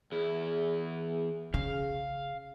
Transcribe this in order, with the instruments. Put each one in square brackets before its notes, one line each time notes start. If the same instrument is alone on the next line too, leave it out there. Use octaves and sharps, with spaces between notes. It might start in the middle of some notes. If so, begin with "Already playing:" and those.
[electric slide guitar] E2 E4 [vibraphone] G#4
[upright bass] C#3 [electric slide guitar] F5